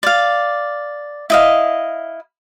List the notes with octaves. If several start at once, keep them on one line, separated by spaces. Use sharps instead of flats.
D5 F5
E4 D#5 F5